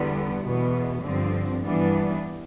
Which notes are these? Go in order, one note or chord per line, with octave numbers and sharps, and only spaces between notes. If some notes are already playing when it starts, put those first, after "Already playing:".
Already playing: E2 D3 G3 B3
E2 B2 B3
G2 D3 F3 C4
G2 E3 G3 B3 D4